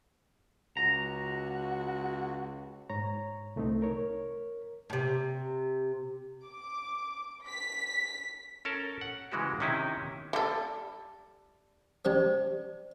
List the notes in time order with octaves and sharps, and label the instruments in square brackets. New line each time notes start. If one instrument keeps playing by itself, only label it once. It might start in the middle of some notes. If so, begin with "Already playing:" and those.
[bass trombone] C#2 [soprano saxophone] F#4 [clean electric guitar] A#5
[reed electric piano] G#2 C#5 A#5
C2 A3 C4 D#4
A#4 C#5
[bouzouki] A2 C3
[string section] D6
B6
[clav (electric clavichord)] C#4 A4 A#4 A5
F#5
C#3 E3 G#3 F#4 G4
C3 D#3 C#4 D#4 E4
[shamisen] G3 A4
[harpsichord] C#4 G4 A5 [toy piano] C5 D5